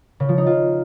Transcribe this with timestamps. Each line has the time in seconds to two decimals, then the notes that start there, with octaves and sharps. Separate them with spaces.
0.20 C#3
0.29 F3
0.38 D#4
0.46 F4